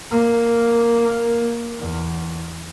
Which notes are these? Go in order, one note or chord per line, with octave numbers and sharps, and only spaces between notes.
A#3
E2